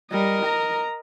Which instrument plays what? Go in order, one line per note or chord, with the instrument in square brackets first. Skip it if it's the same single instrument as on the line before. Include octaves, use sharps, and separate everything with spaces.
[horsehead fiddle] G3 [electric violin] A#4 D#5
[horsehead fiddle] A#5